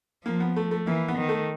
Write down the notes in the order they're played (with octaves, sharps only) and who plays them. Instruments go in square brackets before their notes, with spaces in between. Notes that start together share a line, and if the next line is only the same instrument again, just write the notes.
[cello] F3 [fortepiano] A#3
[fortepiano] B3
A3
A3
[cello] E3 [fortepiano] A#3
[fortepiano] B3
[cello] D#3
[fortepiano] A3